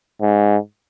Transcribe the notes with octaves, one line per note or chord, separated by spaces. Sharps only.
G#2